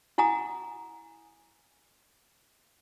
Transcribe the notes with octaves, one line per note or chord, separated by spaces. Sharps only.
E4 F#5 G#5 A#5 D#6